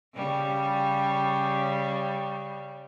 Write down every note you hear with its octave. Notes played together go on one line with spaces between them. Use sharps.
C#3 G3